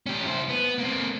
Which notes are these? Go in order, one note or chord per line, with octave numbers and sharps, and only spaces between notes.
C#4 G4
E4 C5
B3
A#3 C4